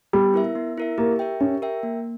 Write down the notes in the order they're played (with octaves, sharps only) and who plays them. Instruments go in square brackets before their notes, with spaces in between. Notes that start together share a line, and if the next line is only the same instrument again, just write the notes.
[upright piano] G3 [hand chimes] B3
[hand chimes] E4 A#4 E5
B3
E4 A#4 E5
[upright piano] A#3 [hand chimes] G4
[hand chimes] A#4 E5 G5
[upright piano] C#4 [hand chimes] G4
[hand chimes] A#4 E5 G5
A#3